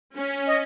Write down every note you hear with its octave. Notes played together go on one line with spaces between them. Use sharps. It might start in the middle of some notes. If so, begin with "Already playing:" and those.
C#4
D#5